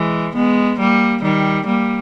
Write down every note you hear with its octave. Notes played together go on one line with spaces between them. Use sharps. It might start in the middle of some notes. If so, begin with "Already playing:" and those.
Already playing: E3 G#3
G#3 B3
G3 A#3
D#3 G3
G3 A#3